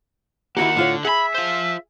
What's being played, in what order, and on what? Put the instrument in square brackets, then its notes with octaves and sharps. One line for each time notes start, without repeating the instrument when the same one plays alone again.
[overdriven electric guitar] D#3 A#3 [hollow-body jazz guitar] E4 F#4 G4 [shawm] F#5
[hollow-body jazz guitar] A2 F4 C#5 [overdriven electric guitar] D3
[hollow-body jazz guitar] G#4 [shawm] E5 [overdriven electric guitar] F#5 B5
[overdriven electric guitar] F4 C5